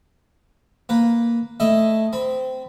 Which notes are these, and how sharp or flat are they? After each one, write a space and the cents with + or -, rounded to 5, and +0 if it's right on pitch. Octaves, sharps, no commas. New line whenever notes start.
A#3 +0 B4 +0
A3 +0 E4 +0 D#5 +0
C4 -20 B5 +0